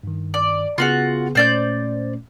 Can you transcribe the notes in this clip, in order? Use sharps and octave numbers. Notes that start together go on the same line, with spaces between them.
G2 D#3
D5
C#3 B3 F4 F#4 G#4 F#5
A#2 A3 C#4 C5 D5 G6